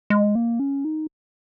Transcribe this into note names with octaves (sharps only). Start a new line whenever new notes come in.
G#3
A#3
C#4
D#4